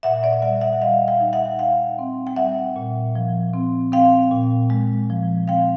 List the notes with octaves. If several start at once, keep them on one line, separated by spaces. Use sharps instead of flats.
A#2 E5 F#5
D5 E5
G3 E5 F#5
E5 F#5
G3 D#5 F5
F5 G5
D#4
E5 F#5
D#4 F5 G5
C4
G5
G3 E5 F#5
A#2
F3
C4
C4 F5 G5
A#2
G#3
F3
C4 F5 G5